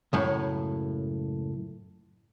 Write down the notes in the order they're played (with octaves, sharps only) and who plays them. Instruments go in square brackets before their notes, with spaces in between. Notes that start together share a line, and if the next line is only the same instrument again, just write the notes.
[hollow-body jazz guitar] C#2 F#2 A2